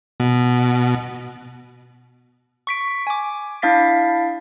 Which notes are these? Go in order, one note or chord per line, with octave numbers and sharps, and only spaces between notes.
B2
C#6 B6 D7
G#5 D6
D4 E4 F5 A6 B6